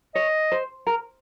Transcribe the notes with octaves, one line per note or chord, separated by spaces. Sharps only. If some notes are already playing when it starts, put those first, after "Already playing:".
C#5 D#5
C5
A#4